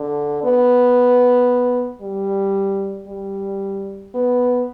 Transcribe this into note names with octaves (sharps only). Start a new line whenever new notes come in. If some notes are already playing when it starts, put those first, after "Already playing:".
Already playing: D3
B3
G3
G3
B3